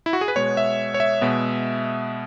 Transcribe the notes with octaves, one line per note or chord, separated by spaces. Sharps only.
E4
F#4
G#4
B4
B2 G#3 B3 C#5
E5
C#5
E5
B2 G#3 B3